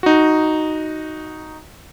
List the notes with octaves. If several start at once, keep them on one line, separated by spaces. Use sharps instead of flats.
D#4 F#4